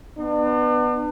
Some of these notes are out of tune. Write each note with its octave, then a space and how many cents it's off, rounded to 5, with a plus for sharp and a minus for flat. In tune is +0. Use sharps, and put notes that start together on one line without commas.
B3 +0 D4 +40